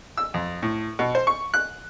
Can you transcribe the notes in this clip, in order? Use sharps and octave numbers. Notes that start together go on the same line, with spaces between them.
E6
F2
A2
B2
C5
C#6
F#6